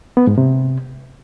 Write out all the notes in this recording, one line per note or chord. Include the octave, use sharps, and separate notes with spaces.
B3
G#2
C3